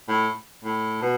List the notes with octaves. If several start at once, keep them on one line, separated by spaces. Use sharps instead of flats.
A2
A2
B2